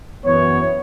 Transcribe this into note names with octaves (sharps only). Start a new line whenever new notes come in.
F#2 E3 B3 C#5